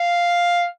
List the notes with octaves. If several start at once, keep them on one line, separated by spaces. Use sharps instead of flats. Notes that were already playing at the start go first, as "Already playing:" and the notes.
Already playing: F5